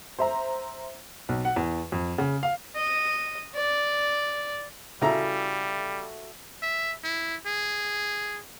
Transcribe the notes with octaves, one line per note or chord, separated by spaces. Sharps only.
C5 E5 A#5
B1
F#5
E2
F2
C#3
F5
D#5
D5
C#3 G3 E4 F#4 A4 E5 A#5
E5
E4
G#4